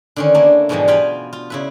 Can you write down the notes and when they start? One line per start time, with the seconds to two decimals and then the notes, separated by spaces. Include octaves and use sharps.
0.16 D3 D#3 C#4
0.34 A3 A#3 D4 E4
0.69 G#2 B2 E3 F3 G3 G#3
0.88 B3 F4 F5 G5 G#5 B5
1.33 F4
1.50 C#3 E4 B4